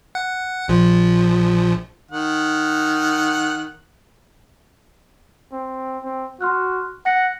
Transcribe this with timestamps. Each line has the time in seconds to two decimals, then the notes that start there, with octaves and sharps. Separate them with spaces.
0.15 F#5
0.68 A#1 F3
2.11 D#3 F#5
5.52 C4
6.04 C4
6.41 F#4 C6 F6 F#6
7.06 F#5 F#6 A#6 C#7